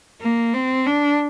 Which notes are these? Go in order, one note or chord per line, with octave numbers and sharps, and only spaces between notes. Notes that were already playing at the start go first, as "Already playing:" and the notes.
A#3
C4
D4